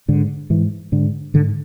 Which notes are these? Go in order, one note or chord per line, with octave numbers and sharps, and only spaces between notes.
G#2 D3
G#2 E3
G#2 D3
G#2 D3